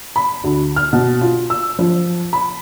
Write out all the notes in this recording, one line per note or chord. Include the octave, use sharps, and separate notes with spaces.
B5
D2
F6
B2
F4
E6
F3
B5